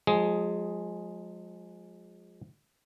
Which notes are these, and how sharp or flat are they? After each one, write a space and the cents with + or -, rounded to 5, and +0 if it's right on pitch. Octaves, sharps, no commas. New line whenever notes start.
F3 +40 G#3 +0 G#4 +0